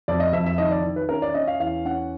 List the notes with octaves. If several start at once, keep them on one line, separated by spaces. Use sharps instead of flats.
F2 D5
D#5
F2 E5
E5
D#3 D#5
D5
D#3
B4
C#4 A#4
D5
C#4 D#5
F5
E2 F5
C#4 F#5